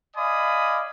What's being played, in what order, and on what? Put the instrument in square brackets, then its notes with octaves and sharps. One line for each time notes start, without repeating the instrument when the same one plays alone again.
[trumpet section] D5 D#5 F5 G#5 B5 D#6